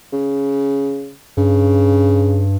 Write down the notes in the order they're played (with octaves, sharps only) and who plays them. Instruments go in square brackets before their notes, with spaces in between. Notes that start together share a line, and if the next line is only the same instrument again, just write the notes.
[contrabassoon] C#3
[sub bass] G2 [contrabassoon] C#3